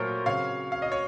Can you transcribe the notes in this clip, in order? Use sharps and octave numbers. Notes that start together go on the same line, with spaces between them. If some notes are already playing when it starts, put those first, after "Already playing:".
Already playing: A#2 F#3 A3 A#4 C5 C#5
C#3 F#3 C4 C#5 F5
F5
D#5
C#5